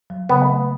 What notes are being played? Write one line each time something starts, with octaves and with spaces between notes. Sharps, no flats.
F#3
C#3 B3
A3